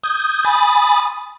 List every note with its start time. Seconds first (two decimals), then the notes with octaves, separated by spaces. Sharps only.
0.04 D#6 G6 G#6
0.45 G#5 B5 D#6 A6